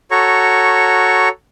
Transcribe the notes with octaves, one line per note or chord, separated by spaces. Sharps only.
F#4 A4 C#5 A#5 C#6